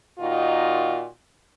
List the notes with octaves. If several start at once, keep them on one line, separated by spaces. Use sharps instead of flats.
A#2 D#3 D#4 F4 F#4